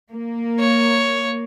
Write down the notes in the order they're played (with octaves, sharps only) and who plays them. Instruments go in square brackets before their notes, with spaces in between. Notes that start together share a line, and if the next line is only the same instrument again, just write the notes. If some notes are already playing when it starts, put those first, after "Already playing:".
[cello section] A#3
[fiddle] C#5